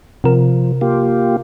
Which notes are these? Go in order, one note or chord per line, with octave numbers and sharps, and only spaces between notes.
C3 F3 A#4
A#3 F4 G4